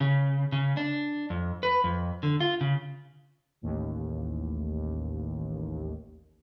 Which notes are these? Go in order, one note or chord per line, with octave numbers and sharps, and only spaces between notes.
C#3
C#3
D4
F2
B4
F2
D3
F4
C#3
A1 D#2